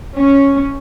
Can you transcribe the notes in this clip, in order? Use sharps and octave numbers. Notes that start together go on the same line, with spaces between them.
C#4